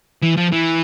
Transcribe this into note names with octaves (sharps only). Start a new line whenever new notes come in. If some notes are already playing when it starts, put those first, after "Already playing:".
E3
F3
E3